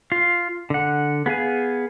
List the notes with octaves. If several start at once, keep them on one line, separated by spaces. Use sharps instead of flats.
F4 F5
D3 F#5
B3 G#4 F5 G#5